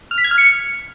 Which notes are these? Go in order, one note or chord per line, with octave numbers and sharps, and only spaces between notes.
F6
B6
G#6
F6
C#7